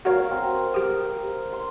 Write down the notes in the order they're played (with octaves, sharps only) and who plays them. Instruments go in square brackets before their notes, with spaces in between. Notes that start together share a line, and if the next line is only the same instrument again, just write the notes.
[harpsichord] F#4 C#5 [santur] A#4 F5
[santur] C4
[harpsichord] G4 D#6
[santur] C6